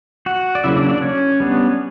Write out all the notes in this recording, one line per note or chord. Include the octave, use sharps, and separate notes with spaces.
F#4 F#5
D5
C#3 F#3 A#3 E4 E5
D4 D5
D4 D5
C#4 C#5
G3 B3 D4